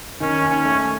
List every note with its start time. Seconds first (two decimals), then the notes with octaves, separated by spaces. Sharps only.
0.20 D#3 C#4
0.42 D#2
0.50 C#4
0.65 A3